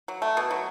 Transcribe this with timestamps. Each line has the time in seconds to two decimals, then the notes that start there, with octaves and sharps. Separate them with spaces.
0.08 F#3
0.22 A3
0.37 B2
0.51 F#3